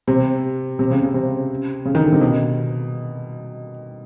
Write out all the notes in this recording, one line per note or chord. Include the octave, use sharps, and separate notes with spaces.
C3
C3
C#3
C#3
C3
C#3
D#3
D3
C3
B2